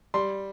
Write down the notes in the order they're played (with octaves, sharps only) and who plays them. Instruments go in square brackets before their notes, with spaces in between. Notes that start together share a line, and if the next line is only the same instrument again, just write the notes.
[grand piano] G3 C6